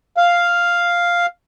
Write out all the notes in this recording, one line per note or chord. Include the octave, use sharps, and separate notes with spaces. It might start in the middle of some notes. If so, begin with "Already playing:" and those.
F5